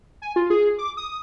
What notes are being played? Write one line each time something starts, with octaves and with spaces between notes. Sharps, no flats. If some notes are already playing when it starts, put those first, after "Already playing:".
G#5
F4
G#4
D6
D#6